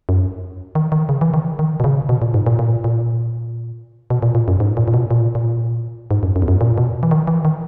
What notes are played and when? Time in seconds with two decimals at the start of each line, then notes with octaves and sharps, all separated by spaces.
0.09 F#2
0.75 D#3
0.92 D#3
1.09 C#3
1.21 E3
1.34 D#3
1.59 D#3
1.80 B2
1.84 C#3
2.09 B2
2.22 A#2
2.34 G#2
2.46 A#2
2.59 A#2
2.84 A#2
4.10 B2
4.22 A#2
4.35 A#2
4.48 F#2
4.60 G#2
4.77 A#2
4.88 A#2
4.94 B2
5.11 A#2
5.35 A#2
6.11 G#2
6.23 F#2
6.36 F#2
6.42 E2
6.48 F#2
6.61 A#2
6.78 B2
7.03 E3
7.11 D#3
7.27 E3
7.45 D#3